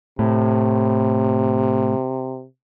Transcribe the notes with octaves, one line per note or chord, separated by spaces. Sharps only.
A2 C3